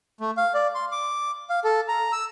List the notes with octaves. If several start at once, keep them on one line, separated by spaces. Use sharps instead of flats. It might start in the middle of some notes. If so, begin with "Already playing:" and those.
A3
F5
D5
C6
D6
F5
A4
A#5
E6